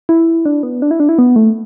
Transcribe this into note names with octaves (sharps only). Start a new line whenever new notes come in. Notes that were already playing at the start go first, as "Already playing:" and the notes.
E4
D4
B3
D4
E4
D4
E4
B3
A3